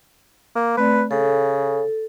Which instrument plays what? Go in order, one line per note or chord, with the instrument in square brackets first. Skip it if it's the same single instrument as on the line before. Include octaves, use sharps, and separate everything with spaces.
[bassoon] A#3
[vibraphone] A3 C4 D5 [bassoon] B4
[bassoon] C#3 [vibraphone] A4